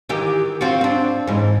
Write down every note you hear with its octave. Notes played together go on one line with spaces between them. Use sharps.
D#3 E3 G4
C4 F4 F#4
C4 D4
G#2 E3